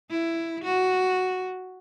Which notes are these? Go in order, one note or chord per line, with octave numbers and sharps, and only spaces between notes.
E4
F#4